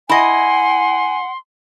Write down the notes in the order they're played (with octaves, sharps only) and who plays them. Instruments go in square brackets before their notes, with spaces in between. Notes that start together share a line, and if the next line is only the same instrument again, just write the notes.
[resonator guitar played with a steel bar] E4 D#5 [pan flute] F#5 [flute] G#5 [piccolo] C6